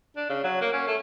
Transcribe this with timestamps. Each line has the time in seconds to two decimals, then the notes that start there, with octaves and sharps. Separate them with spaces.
0.16 D4
0.29 C#3
0.44 F#3
0.61 A#3
0.73 C#4
0.87 A3